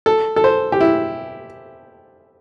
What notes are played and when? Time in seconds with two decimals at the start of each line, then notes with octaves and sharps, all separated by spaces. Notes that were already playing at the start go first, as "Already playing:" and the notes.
0.06 A4
0.36 A4
0.44 C5
0.72 G4
0.81 E4